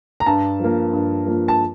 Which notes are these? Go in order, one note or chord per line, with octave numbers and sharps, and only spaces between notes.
A#5
G2 A5
F3 A#3
G2
F3 A#3
A5